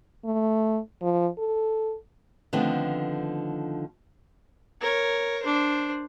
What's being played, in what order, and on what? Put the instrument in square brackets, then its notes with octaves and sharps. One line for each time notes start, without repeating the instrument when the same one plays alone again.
[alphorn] A3
F3
A4
[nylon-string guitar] D3 D#3 F3 A3 B3 C4
[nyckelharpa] A#4 C#5
D4 C5